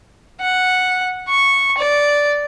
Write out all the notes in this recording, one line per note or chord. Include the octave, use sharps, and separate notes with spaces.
F#5
C#6
D5